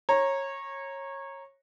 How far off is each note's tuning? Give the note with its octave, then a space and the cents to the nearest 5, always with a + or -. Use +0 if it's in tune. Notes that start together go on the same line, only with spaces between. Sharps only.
C#5 -20 A#5 +0